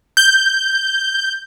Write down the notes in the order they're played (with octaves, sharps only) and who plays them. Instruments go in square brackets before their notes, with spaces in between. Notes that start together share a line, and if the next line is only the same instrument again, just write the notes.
[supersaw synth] G6